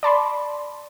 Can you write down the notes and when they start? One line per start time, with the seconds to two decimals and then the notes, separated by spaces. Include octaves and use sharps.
0.03 D5 A5 B5 C6